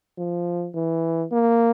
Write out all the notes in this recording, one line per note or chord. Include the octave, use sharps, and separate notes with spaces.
F3
E3
A#3